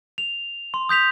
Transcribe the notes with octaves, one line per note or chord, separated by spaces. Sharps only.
F7
C6
D#6 G6 B6 F7